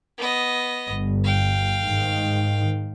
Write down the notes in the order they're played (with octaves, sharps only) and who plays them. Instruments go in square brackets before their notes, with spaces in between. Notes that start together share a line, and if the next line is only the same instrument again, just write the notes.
[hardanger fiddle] B3 D#5
[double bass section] G1
[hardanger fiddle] F5 G5
[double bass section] G#2 D#3